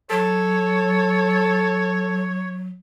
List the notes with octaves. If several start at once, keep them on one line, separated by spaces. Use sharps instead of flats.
F#3 A4 C#5